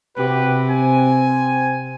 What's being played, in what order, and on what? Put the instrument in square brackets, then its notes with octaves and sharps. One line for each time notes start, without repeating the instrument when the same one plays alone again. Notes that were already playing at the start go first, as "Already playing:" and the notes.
[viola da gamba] C3 [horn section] F#4 G4 B4
[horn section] C4 G#5